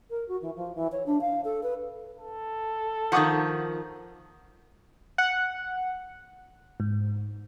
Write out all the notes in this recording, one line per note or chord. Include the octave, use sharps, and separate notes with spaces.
A#4
F#4
E3
F3
E3
C#5
D4
F5
A4
B4
A4
D#3 F3 F#5 C#6 D#6
F#5
G#2